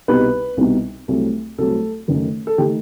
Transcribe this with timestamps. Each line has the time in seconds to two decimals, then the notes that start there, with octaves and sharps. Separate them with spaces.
0.08 C2 B2 G3 B3 D#4 B4
0.57 C2 B2 G3 B3 D#4
1.08 C2 C3 F#3 A3 C4
1.58 C2 C3 F#3 A3 C4 A4
2.08 F#2 D#3 A3 D#4
2.47 A4
2.58 D#3 A3 D#4 G4